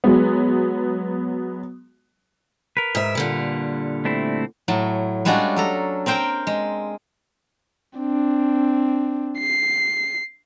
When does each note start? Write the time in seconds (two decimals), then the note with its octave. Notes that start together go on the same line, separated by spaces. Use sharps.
0.04 F#3 G#3 B3
2.77 A#4 B4
2.95 G#2 E5
3.15 A#2 D3 G3
4.05 A3 C4 E4
4.68 A2 F#3 A5
5.25 G3 G#3 C#4 D4 F4 F#4
5.56 F#3 A4 A#5
6.06 C4 A#4 C5 G5 A#5 C6
6.47 G#3
7.98 C4 D4
9.39 C7